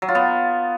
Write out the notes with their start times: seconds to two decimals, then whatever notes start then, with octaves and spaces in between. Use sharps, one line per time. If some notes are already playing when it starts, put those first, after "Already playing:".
0.02 F#3
0.09 F4
0.15 B3